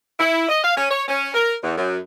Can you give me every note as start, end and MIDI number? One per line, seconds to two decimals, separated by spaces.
0.19 0.46 64
0.49 0.63 75
0.64 0.76 77
0.76 0.89 61
0.91 1.04 73
1.08 1.30 61
1.34 1.55 70
1.63 1.76 40
1.77 1.98 42